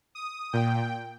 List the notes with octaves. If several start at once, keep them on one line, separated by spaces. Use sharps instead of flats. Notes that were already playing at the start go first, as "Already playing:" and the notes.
D#6
A#2 G5